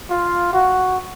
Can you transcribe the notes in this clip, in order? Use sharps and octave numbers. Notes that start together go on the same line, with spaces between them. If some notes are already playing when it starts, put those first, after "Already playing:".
F4
F#4